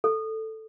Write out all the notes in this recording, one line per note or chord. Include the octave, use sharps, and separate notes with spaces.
A4